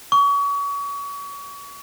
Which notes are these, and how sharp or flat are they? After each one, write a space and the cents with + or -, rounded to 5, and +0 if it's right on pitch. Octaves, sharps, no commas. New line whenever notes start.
C#6 +35